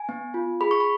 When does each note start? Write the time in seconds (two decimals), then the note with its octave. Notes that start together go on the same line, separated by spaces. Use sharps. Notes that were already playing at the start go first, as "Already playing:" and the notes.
Already playing: G#5
0.09 B3
0.34 F4
0.61 G#4 B5
0.71 C#6
0.80 B5